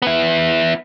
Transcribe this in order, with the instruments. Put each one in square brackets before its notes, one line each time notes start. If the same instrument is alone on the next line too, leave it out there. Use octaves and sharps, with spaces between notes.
[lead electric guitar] B3 E4